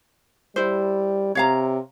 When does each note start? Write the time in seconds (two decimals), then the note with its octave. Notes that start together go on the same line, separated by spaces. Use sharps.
0.56 G3 E4 C5
1.35 C3 C#5 F5 A#5